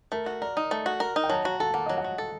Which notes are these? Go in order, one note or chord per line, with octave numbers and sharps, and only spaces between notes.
A3 A#4
F#4
A#4 D5
D#4
A3
F#4
A#4
D#4
G5
F#3 A5
F#4 A#5
A4 A5
A#3 F#5
F#3 D#5
F#5
F#4
A4